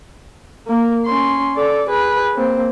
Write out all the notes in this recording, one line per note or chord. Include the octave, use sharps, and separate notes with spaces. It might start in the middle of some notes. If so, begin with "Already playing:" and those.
A#3 A#4
C#4 C6
A4 D5
G#4 B4
A#3 C4